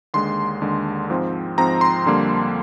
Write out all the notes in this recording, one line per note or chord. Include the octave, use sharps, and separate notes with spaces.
D#2 D3 G#3 C6
D#2 D3 G#3
G#2 F3 C4
G#2 F3 C4 A#5
C6
F2 D3 G3 A#3